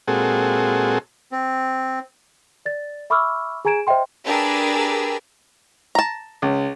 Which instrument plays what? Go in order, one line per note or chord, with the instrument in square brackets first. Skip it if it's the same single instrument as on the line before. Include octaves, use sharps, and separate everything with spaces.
[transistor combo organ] A#2 G#3 C4 F#4 G#4 A4
[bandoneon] C4
[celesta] D5 A6
E5 B5 C#6 D6 E6 F6
G#4 G#5 A#5 G#6 D7 E7
C5 D#5 E5 G5 C6
[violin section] D4 G4 G#4 A#4 B4 E6
[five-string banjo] A5 A#5
[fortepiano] C#2